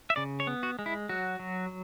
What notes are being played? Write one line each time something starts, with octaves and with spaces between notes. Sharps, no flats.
E5
C#3 D5
C#5
B3
F#4
G#3
E4
F#3 F#4
F#3